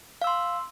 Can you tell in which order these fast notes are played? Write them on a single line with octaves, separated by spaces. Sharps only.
F5 E6 C6